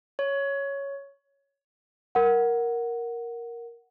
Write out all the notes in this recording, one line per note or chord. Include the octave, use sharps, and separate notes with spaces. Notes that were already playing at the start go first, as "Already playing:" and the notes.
C#5
A#4 F#5